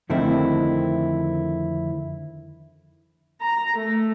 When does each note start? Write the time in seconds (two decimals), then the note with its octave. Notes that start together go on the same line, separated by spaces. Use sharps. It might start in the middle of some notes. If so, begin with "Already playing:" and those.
0.10 F2 D3 D#3 A3 C4 E4
3.41 A#5
3.75 A3